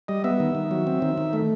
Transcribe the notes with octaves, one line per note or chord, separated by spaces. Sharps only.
G3 D#5
B3 E5
D#3
D#3
F#3
C4
D#3
D#3
A3